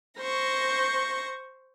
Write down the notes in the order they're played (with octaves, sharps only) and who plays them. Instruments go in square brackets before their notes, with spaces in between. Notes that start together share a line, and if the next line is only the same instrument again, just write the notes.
[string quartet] C5 C#6 A#6